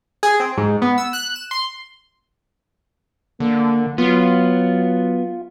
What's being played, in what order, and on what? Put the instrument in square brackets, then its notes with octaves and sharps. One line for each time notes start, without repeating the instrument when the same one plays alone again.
[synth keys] G#4
C4
G#2
B3
E6
F#6
E7
C6
[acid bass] D3 [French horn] A#3
[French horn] F#3 [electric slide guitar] B3 [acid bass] F4